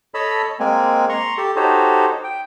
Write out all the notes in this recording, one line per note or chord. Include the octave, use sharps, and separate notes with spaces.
A4 C#5 D#5 A5 B5 E6
G#3 A#3 C4 G#5
A#5 C6 C#6
G4 A4 A5
D#4 F#4 G4 A4 C5 C#5
G5